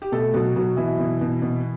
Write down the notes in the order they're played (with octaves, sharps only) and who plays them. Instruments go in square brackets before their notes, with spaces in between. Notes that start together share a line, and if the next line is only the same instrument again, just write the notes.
[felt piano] G4
B2 A3 A4
B2 F#3 F#4
B2 F#3 F#4
B2 E3 E4
B2
B2
B2